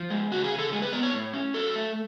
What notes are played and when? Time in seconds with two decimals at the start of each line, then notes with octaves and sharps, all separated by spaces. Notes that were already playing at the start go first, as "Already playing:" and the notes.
Already playing: F3
0.10 G#3
0.32 C#3 F#4
0.44 G#4
0.51 C#3
0.58 A4
0.72 G#3 G#4
0.82 B4
0.92 B3 D5
1.03 C#5
1.14 A2
1.33 C#4
1.54 F#3 A4
1.75 A3